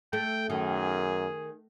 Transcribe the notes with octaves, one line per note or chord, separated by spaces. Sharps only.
A3 G5
F#2 D#3 G#4